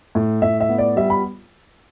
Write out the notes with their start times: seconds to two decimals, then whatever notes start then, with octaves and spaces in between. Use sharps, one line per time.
0.15 A2
0.42 A2 E5
0.60 E5
0.69 B3
0.78 D5
0.96 G3 E5
1.10 B5